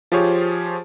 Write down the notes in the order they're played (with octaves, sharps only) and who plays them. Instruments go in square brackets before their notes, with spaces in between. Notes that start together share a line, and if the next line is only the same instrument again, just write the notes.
[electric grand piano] F3 F4 G4 G#4 C5 C#5